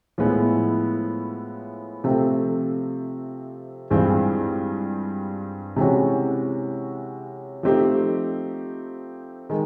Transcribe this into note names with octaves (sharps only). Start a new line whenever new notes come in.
A2 F3 G#3 B3 E4
C3 F3 A3 C4
G2 E3 G#3 C4 F4
C3 E3 G#3 C#4 F#4
F3 A3 C4 D#4 G4
D#3 G#3